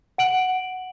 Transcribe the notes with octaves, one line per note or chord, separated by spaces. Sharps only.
F#5 D7 F#7